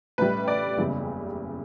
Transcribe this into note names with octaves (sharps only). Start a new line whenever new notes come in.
A1 A2 G3 B4
D5
F#1 E2 C#3 G3